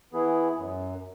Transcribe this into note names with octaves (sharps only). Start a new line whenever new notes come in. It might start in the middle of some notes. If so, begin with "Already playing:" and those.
E3 B3 E4 G#4
F#2